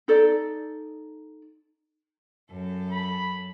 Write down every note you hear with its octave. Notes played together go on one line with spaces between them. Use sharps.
D#4 A4 D5
F#2 A4
B5